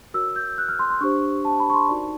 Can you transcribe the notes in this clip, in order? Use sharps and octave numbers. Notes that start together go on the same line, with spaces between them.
F#4 A#4 C#5 E6
G6
F#6
F6
C6
C6
D4 G4 C5 C#6
A5
B5
C#6
C6
D#4 F#4 A#4 D5